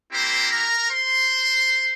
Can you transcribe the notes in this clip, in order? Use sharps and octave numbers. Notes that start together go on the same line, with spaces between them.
A#3 C4 E4 G4 C5
A#4 A#5
C5 C6